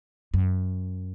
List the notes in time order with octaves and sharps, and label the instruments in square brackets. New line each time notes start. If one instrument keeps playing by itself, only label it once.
[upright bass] F#2